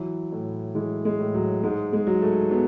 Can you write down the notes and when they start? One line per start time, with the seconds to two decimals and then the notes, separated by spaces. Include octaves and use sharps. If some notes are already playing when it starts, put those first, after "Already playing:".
Already playing: E3 F#3
0.32 A2
0.75 E3 G#3
1.05 G#3
1.19 A2
1.34 F#3
1.63 G#2 G#3
1.93 G#3
2.07 F#3
2.22 A3
2.51 F#3 B3